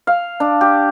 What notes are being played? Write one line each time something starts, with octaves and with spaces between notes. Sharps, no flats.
F5
D4
G4